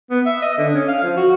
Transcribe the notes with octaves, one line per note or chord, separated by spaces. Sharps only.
B3
E5
D#5
D3
C#4
F5
F3
F#4